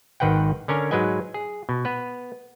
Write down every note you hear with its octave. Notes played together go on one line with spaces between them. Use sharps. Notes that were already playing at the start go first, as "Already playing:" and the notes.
G#1 G#2 D#3 B4 F#5 G5
D3 C#4 A#4 C#5 G#5
G#2 F#3 G#3 B4 D#5 G#5
G#4
B2
B3 B4